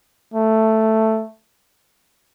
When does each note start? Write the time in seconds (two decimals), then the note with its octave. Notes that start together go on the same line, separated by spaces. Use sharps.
0.34 A3